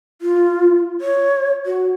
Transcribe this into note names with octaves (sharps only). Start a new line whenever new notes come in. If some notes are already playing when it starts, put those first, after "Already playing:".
F4
C#5
F#4